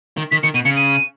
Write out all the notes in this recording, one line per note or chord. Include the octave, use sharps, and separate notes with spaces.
D#3
D#3 B6
D#3 C#7
B2 D#7
C#3 C#7
D#7